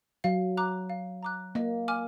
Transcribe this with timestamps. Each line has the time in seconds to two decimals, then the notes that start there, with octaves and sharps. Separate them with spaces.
0.24 F#3 F5
0.57 A#5 D6 F#6
0.90 F5
1.23 A#5 D6 F#6
1.55 A#3 D#5
1.88 G#5 D6 F6